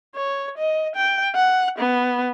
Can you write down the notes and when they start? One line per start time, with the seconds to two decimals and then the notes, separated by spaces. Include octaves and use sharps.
0.15 C#5
0.58 D#5
0.96 G5
1.35 F#5
1.79 B3